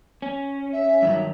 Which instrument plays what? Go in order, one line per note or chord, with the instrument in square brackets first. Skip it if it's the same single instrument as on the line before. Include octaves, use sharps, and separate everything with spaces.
[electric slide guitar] C#4
[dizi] E5
[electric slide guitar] G2 D#3 F#3